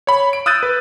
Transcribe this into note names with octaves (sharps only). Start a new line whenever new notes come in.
C#5 B5
D7
D#6 E6 F#6 G6 A6 D#7
B4